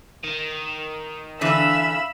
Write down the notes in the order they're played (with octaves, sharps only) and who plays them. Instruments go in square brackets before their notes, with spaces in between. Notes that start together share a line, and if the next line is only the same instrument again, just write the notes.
[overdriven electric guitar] D#3
[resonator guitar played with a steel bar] D3 E3 [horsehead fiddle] E5 F5 [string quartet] B5 E6